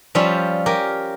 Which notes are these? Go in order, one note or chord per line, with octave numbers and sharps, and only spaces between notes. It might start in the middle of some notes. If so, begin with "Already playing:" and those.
F3 G3 C#4 F4 E5
G4 A#4 G#5